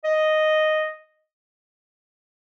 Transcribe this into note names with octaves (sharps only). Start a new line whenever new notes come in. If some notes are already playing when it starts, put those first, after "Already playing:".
D#5